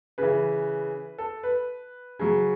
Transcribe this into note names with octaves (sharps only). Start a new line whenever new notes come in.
C#3 E3 B4
A4
B4
C#3 F#3